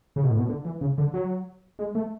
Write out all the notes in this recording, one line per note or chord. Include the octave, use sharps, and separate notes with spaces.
C#3
B2
A2
B2
D3
E3
C#3
D3
F#3
G#3
A3